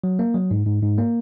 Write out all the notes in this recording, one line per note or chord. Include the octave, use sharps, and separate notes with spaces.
F#3
A#3
F#3
G#2
G#2
G#2
A#3